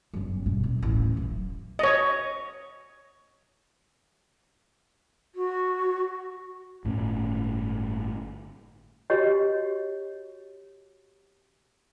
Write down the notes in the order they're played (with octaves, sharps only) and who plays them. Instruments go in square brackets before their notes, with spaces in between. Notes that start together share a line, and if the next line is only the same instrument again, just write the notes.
[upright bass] G1 F#2
G2 B2
D#1
D#1 A1
F#2
[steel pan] C#5 D#5
[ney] F#4
[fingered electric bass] G1 A2 C3 C#4
[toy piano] F#4 G4 C#5 D#5